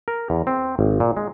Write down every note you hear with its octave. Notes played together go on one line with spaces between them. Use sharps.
A#4
E2
C4
G#1
A#2
G#3